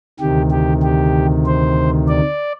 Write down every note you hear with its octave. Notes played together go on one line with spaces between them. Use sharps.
D2 C3 D#3 G4
G4
G4
C5
D5